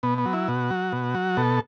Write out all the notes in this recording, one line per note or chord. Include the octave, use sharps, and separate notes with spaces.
B2 B3
B3
F#3
E4
B2 F#4
F#3
B2
F#3
B2 A4